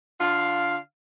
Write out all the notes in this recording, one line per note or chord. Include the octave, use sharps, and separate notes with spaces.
D3 F4 F5